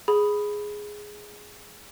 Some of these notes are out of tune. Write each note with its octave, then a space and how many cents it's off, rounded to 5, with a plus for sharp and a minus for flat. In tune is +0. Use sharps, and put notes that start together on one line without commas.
G#4 +0 B5 +0